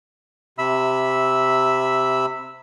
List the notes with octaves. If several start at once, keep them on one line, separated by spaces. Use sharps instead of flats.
C3 E5 B5 E6